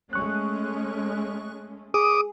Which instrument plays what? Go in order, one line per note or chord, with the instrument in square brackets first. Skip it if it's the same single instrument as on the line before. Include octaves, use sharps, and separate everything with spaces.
[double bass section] G#3 A3 C#4 [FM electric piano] C#6 F#6
[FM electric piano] G#4 [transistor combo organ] D6 D#6